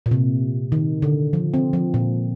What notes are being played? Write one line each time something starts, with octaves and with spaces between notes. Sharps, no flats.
A#2
C3
D#3
D3
F3
C4
F3
A#2